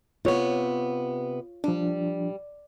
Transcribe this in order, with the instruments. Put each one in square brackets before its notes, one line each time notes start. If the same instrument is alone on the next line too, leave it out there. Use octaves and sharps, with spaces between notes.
[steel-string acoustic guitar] C3 B3 [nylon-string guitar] F4 C#5
[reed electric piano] F3 D4 [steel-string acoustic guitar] G3